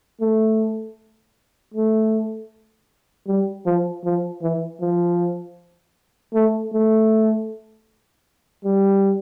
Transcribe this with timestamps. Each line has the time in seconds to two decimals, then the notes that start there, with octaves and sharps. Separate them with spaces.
0.20 A3
1.74 A3
3.27 G3
3.66 F3
4.04 F3
4.42 E3
4.81 F3
6.34 A3
6.73 A3
8.65 G3